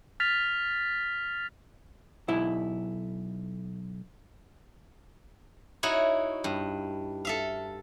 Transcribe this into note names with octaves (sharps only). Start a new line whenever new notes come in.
F6 A6 B6 F7
B1 E4
D#4 E4 F#4 C#5
G2
A4 E5 F5